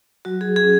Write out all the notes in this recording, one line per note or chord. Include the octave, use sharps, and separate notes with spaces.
F#3 F#4
G#4
C#4 F#4 G#4